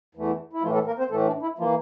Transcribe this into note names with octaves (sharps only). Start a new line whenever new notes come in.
E2 E3 A3
E4
A2 E3 F3 A3 F4
A3 A4
A#3 A#4
C4 C5
A2 E3 A3 A4
D4
E4
E3 F3 A#3 F4